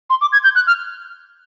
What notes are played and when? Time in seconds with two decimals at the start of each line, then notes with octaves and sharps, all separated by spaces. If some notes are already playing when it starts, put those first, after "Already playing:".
0.10 C6
0.21 D6
0.33 G#6
0.44 G6
0.55 F#6
0.67 F6